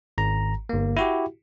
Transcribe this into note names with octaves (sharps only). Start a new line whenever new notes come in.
G#1 A#5
G1 A#3
E4 F#4 G4